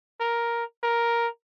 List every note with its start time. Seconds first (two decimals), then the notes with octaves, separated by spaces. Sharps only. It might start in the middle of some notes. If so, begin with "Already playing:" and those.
0.20 A#4
0.83 A#4